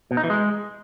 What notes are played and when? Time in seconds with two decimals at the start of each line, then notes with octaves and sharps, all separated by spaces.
0.11 B2
0.17 D#4
0.24 E3
0.30 G#3